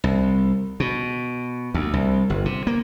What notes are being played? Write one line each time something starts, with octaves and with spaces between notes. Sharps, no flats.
C2
B2
D2
C2
G1
C3
A#3